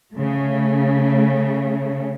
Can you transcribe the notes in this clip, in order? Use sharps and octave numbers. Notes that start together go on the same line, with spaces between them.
C#3 A3